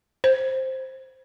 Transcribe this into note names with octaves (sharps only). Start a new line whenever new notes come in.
C5